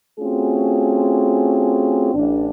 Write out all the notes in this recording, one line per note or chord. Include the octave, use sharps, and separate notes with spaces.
A3 C4 C#4 F4 F#4 G#4
A1 D4